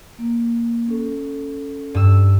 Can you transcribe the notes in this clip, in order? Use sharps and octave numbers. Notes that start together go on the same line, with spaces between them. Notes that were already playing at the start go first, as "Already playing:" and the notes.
A#3
C#4 A4
G2 E6